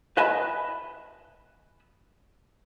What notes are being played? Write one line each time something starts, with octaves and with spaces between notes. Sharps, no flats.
B4 D#5 E5 G#5 A5 B5